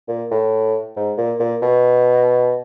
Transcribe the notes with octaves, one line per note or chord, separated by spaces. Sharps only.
A#2
A2
G#2
A#2
A#2
B2